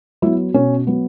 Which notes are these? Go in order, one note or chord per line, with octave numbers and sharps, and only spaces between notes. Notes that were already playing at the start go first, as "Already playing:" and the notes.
F#3 B3 E4
B2 C#4
F#3 B3